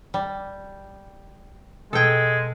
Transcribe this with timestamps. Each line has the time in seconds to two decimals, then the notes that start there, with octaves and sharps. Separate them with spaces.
0.14 G3
1.93 B2 G#3 A4 G5 G#6